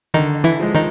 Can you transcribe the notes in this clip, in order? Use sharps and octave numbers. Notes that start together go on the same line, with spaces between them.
D3 D#3 D#4
E3 E4
F3 G#3
D#3 D#4